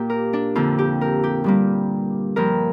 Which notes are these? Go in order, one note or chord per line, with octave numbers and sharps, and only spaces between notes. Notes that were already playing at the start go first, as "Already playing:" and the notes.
Already playing: A#2 A#3 G4
A#4
D4
F2 D3 A#3 F4
G4
A#4
G4
G2 G3 A#3
G2 F3 A#3 A#4